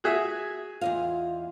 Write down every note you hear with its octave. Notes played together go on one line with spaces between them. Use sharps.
F#4 G#4 E5 G#6
E2 F4 D#5 F5